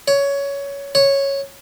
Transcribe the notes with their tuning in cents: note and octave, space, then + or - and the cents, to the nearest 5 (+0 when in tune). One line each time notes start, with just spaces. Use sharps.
C#5 +15
C#5 -5